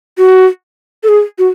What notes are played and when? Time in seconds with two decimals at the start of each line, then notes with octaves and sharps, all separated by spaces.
0.18 F#4
1.03 A4
1.08 G#4
1.39 F#4